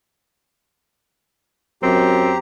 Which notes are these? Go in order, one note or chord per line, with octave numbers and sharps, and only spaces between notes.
F#2 C4 G4 A#5